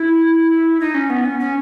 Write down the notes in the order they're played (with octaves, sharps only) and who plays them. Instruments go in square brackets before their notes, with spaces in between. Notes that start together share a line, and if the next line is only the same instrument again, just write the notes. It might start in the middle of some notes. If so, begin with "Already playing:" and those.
Already playing: [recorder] E4
D#4
C#4
B3
C#4
C#4